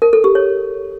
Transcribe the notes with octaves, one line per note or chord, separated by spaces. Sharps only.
A#4
A4
G4
C#5